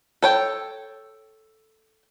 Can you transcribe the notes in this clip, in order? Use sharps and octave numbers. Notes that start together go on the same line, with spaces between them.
A4 C#5 G5